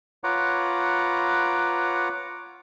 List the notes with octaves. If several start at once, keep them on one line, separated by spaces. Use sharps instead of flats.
F4 B4 C#5 F#5 A#5 D6